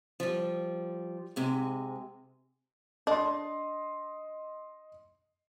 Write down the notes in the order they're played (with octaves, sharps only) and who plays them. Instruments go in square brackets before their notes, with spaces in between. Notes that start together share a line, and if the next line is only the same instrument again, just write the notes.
[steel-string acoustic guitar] F3 G3
G#2 C3 G#3
[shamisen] D4 [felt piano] D#5 C6